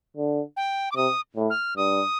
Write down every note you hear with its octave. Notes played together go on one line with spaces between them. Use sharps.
D3
G5
D6
C3 D#6
A2
F6
G2 D#6